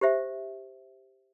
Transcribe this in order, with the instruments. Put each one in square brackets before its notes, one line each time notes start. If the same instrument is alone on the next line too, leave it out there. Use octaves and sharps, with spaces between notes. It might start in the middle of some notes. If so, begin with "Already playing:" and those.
[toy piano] G4 C5 E5